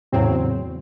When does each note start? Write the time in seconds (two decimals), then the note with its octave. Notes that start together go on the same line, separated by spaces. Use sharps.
0.12 E2 A2 C#3 F#3 C4